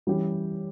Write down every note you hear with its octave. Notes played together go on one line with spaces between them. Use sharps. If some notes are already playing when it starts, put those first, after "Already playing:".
E3 G3 C#4 G4